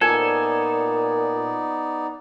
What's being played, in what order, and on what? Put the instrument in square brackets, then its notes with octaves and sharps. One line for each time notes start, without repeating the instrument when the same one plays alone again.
[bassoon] A#2 [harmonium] B3 D#4 D5 [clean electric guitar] A4 [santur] G#5